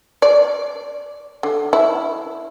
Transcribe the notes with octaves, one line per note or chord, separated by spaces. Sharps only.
D5
D3
E4